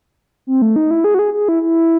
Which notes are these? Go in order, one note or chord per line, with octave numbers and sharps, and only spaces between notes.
C4
A3
D#4
E4
G#4
F#4
G#4
G#4
E4
E4